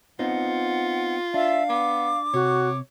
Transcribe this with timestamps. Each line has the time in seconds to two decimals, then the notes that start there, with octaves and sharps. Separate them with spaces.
0.19 B3 C4 D#4 F4 F#5
1.34 D4 E5 F5
1.69 B3 D6
2.34 C3 F#4 C#5